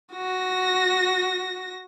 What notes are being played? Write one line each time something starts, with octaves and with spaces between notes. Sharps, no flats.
F#4 A#6